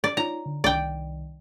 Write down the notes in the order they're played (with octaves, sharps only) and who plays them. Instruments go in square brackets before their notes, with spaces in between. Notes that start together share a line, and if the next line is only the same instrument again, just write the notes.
[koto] D5
[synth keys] D#4 F4 C#5 [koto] A#5
[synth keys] D3
[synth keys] C2 D#3 [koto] D5 G5